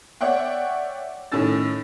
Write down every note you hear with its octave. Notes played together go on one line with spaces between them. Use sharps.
C#5 D5 E5 F#5 G5
A2 D#3 C#4 E6 A6